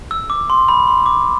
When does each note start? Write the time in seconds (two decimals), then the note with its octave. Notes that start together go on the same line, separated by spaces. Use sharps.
0.11 E6
0.30 D6
0.50 C6
0.68 B5
0.87 C6
1.06 D6